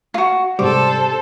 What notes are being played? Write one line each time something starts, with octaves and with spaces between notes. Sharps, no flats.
F4 F#4
G#2 C3 G3 A4 C5 D6